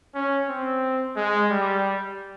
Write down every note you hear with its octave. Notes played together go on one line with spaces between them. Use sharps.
C#4
C4
G#3
G3